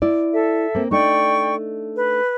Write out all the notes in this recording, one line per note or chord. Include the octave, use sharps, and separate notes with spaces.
E4 D5
A4 E5
A#3 C4
A3 D4 D#4 D5 G5 C#6
B4